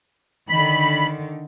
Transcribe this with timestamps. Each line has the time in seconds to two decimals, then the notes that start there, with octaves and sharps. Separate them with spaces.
0.49 D3 D#3 B5